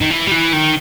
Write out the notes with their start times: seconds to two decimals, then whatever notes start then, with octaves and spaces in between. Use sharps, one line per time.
0.01 D#3
0.10 E3
0.27 G3
0.31 E3
0.53 D#3